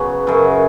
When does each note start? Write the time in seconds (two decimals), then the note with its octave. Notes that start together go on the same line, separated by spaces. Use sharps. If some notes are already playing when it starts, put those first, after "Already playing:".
Already playing: C#3 F#3 B3 B4
0.27 F#2 C#3 F#3